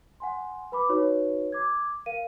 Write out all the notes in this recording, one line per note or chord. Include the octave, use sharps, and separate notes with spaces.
F#5 G#5 C6
B4 B5 D6
D#4 F#4 B4 C#5
D6 G#6
A#4 F5 D#7